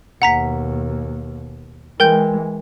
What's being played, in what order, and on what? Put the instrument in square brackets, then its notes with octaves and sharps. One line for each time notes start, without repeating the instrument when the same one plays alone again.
[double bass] D#2 B2 [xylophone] F#5 A#5 B6
[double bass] E3 G#3 [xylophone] A#4 G5 G6